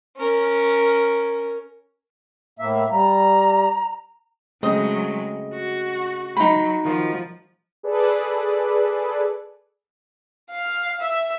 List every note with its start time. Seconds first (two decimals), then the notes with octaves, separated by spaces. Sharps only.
0.18 C#4 A#4
2.59 A2 A#3 E5
2.90 G3 A#5
4.63 C#3 F#3 G#3 A3 C4 D#5
5.54 F#4
6.37 F#3 D#4 B5
6.85 D#3 F3 F4 F#4
7.83 G#4 A4 B4 D5
10.51 F5
11.00 E5